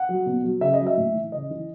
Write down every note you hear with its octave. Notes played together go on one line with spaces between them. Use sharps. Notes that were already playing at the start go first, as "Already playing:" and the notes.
Already playing: F#5
F#3
B2
F#3
C#3 E5
D#5
F#3
E5
A2
E3
C#3 D#5
E3